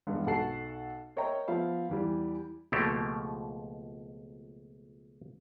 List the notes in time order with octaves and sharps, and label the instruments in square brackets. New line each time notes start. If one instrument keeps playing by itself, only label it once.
[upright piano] E2 G2 G#3 B3
B1 F#4 A4 F#5 A5 C7
A#4 C#5 D#5 E5 G5 A#5
F3 B3 E5 F5 B5
E2 E3 G3
[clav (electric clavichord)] C#2 B2 F3 A3 A#3 G4